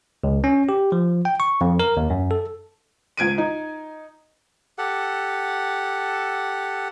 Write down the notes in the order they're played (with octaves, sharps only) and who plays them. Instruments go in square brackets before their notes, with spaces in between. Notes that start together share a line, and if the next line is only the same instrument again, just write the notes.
[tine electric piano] C#2
C#4
G4
F3
G5
C#6
F2
A#4
D#2
F#2
A4
[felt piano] C#2 G#6 D7 D#7
D#4
[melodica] G4 A4 F#5